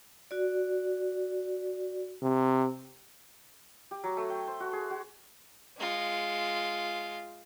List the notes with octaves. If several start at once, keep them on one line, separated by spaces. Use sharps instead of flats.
F#4 D5
C3
G4
F#3
A3
G5
C5
F#4
G#4
F#4
G#3 F4